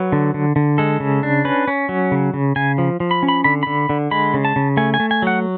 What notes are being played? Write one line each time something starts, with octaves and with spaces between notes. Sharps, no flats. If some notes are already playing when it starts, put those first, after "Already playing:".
Already playing: F#3 B4
D3
D3
D3
G#3 A4
C#3
D4
C#4 B4
C#4
F#3
C#3
C#3
C#3 G#5
F3
F3
B5
C#4
B5
D3 B5
D3 B5
D3
G#3 B5
C#3
A5
C#3
A3 G#5
G#5
A3
G#5
F#3 F#5